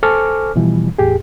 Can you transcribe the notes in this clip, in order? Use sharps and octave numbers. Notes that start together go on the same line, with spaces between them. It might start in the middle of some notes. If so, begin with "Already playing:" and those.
A4 C5 G#5 C#6 D6 F6
B2 E3 F3 G3
E2 A2 G4 G#4